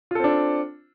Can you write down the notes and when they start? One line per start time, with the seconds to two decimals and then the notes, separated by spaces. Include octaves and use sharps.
0.11 F4
0.15 A4
0.20 C4
0.24 D4